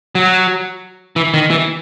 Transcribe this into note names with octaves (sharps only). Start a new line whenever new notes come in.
F#3
E3
D#3
E3